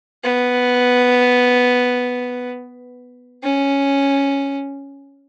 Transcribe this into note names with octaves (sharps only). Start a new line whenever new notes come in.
B3
C#4